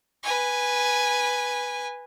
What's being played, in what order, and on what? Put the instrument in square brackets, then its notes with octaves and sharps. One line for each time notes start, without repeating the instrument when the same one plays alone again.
[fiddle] B4 G#5